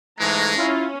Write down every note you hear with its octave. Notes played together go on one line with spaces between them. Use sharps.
G#2 E3 G#3 A3 A#5
C#4 E4 F4